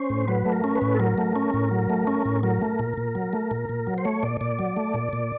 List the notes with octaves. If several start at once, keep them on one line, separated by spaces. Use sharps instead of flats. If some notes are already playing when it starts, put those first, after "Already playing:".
Already playing: C#4 C5
A2
F#3 B4
A3
A#4
C#4
B4
A2
A4
F#3 A#4
A3
C#4
A2
F#3
A3
C#4
A2
F#3 A#4
A3
A#2
A#2
F#3
A3
A#2
A#2
F#3
C5
A3 C#5
A#2 D5
A#2 D5
F#3
A3
A#2
A#2